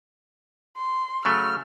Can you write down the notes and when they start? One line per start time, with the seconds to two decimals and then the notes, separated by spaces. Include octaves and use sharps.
0.77 C6
1.25 C#3 F#3 A3 F6